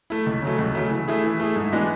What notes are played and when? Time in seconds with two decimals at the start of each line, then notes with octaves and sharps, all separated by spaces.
0.10 A3 E4
0.26 C#2
0.42 C#3 F#3 A3
0.59 C#2
0.75 C#3 F#3 A3
0.91 E3
1.08 A3 E4 G#4
1.24 E3
1.40 A3 E4 G#4
1.56 G#2
1.72 E3 G#3 B3 D4